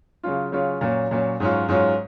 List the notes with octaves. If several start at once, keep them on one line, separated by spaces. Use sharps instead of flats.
C#3 F#3 C#4 F4
C#3 F#3 C#4 F4
A#2 F#3 C#4
A#2 F#3 C#4
G#2 F#3 C#4 F4
G#2 F#3 C#4 F4